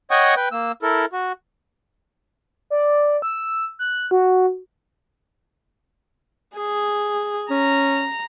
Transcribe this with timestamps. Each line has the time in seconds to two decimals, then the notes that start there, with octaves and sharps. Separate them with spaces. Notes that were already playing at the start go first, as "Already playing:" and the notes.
0.11 C#5 D#5 F#5 G5 C#6 D#6
0.36 B4 G5
0.52 A#3 E6
0.82 E4 A4 A#4
1.13 F#4
2.70 D5
3.22 E6
3.79 F#6
4.11 F#4
6.56 G#4
7.51 C#4 A#5